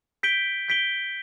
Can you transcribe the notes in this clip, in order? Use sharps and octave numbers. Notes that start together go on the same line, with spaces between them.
G6 B6 D7 G7
G6 B6 D7 G7